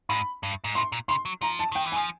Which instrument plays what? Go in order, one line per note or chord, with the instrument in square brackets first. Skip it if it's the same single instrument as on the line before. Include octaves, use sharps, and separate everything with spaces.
[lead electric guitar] G#2 [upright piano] B5
[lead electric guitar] G2
G#2
[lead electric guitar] A2 [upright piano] C6
[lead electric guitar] A#2
[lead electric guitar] C#3 [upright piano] C6
[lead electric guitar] F#3
[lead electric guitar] F3 [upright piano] A#5
[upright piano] A5
[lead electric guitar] D#3 [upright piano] G5
[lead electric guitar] E3
[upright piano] G#5
[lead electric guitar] F3